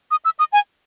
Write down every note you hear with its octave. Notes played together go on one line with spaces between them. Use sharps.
D#6
E6
D#6
G#5